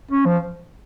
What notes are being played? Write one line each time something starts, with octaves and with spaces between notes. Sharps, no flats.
C#4
F3